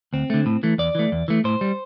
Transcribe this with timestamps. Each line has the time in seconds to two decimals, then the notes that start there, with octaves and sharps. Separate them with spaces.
0.13 D2 C4
0.30 D3 A3
0.46 A2
0.63 E3 A3
0.78 E2 D5
0.95 E3 A3
1.12 E2
1.28 E3 A3
1.44 A2 C5
1.61 G3